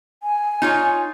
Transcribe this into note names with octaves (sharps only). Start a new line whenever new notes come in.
G#5
D#4 F4 C#5